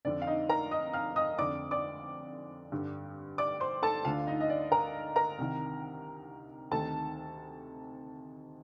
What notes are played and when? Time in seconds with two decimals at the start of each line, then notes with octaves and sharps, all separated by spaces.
0.05 F2 D3 D5
0.22 F5
0.27 D#4 D#5
0.49 A#4 A#5
0.71 D#5 D#6
0.93 F5 F6
1.16 D#5 D#6
1.38 F2 D3 D5 D6
1.71 D5 D6
2.72 G2 D3
3.38 D5 D6
3.60 C5 C6
3.82 A4 A5
4.05 D2 D3 F4 F5
4.27 D#4 D#5
4.41 D#5
4.50 D5
4.72 A#4 A#5
5.16 A#4 A#5
5.38 C2 C3 D#3
6.71 D2 C3 D#3 A4 A5